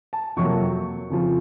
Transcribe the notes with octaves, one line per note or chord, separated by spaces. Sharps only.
A5
F2 C3 F#3 A#3 C#6
F2 C#3 F3